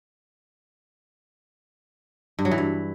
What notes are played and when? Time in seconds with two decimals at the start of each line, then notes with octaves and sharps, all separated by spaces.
2.39 G2
2.45 F#3
2.51 E3
2.58 G2